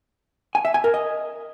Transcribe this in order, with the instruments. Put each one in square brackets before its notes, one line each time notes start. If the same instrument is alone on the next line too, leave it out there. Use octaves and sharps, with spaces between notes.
[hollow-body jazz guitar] G#5
E5
G#5
A#4
D#5